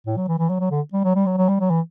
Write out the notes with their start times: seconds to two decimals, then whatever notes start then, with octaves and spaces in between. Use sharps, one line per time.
0.06 A2
0.17 F#3
0.28 E3
0.39 E3
0.49 F#3
0.60 F#3
0.71 D3
0.93 G3
1.04 F#3
1.16 G3
1.26 F#3
1.37 F#3
1.49 G3
1.60 F#3
1.70 E3